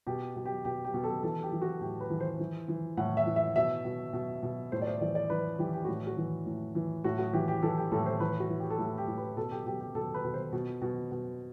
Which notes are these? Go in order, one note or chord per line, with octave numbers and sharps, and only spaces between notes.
B2 G4
B2
G4
B2 G4
G4
B2
A4
E3 A4
G4
E3
F#4
A2 G4
B4
E3
C5
E3
E3
A2 F#5
E5
E3
E5
B2 E5
B2
B2
B2
A2 C5
D5
C5
E3 D5
D5
E3 B4
E3 G4
G4
A2 F#4
F#4
E3
A2
E3
A2 F#4
F#4
E3 G4
G4
E3 A4
G4
A2 A4
C5
E3 B4
F#4
E3
G4
A4
A2 G4
G4
A2
B4
B2 A4
G4
B2 G4
G4
B2 A4
B4
B2
C5
B2
B2
B2